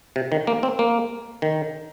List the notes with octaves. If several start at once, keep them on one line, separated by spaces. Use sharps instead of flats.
C3
D#3
A#3
C4
A#3
D#3